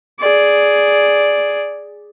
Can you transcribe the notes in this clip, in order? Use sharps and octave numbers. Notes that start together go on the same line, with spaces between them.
G#4 D5